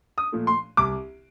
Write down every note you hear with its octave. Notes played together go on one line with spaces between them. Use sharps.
D#6
A#2 F3 A3
C6
C2 D6